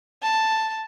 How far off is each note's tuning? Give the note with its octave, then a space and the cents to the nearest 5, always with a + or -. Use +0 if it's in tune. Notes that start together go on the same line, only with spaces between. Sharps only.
A5 +5